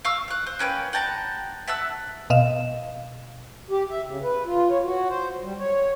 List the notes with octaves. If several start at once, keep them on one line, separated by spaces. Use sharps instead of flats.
F5 C#6 E6
F5 F#5
C5
A#3 C#4 B4 G5
F#5 G5 A5 A#5
E5 F#5 A5 E6
B2 D#5 F5 E7
G4
E5
C#3
B4
F4
C#5
F#4
C5
G3
C#5